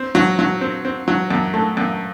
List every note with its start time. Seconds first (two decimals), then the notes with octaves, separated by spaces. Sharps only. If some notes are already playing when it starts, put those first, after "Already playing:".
Already playing: C4
0.15 F#3
0.39 F#3
0.61 C4
0.85 C4
1.08 F#3
1.31 F#2
1.54 A3
1.77 F#2